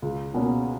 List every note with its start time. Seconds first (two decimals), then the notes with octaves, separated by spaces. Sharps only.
0.02 C#2
0.34 B2 A#3 C#4